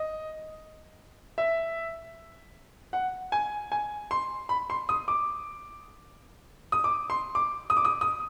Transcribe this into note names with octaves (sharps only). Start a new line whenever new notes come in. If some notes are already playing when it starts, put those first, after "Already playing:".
Already playing: D#5
E5
F#5
G#5
G#5
C6
B5
C6
D#6
D6
D#6
D6
C6
D6
D#6
D6
D#6
D#6